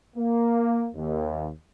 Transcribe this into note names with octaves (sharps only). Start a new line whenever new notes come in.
A#3
D#2